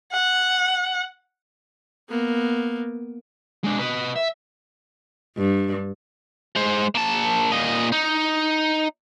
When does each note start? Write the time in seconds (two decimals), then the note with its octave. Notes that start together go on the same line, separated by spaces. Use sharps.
0.12 F#5
2.09 A#3 B3
3.64 G#3 D4
3.79 B4 D#5
4.16 E5
5.37 G2
6.56 G#3 C5
6.95 A#3 A5
7.52 A#2 D#5
7.92 D#4